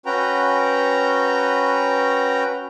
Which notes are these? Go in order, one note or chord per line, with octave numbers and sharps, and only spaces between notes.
C#4 F#4 B4 G5 A#5